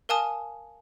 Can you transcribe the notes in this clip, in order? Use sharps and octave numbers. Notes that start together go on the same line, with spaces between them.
A#4 F5 G#5 A5 D#6